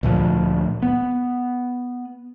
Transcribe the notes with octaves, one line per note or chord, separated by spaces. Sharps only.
D2 A#2 F3
B3